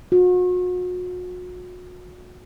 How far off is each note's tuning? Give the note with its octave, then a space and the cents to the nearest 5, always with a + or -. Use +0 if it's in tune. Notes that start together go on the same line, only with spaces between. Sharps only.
F#4 -40